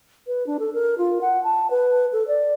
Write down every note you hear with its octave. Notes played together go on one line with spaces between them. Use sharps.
B4
D4
A4
A#4
F4
F#5
A5
B4
A4
D5